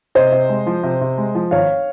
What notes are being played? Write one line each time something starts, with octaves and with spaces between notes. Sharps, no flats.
C3 C5 D#5
C3
G#3
F3
C3
C3
G#3
F3
G#1 C#5 F5